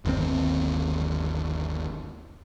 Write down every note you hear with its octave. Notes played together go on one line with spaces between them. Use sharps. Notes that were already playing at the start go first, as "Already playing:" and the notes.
G1 D#2 C4